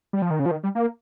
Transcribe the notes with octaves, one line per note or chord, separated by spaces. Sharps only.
G3
F3
D#3
C#3
F3
D#3
G3
A#3